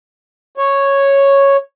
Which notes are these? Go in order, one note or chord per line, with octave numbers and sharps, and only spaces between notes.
C#5